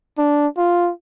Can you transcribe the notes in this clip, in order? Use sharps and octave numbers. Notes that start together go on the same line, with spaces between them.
D4
F4